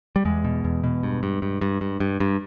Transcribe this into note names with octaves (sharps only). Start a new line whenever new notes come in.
G3
E2 G#3
B2
E2
B2
G2
G2
G2
G2
G2
G2
G2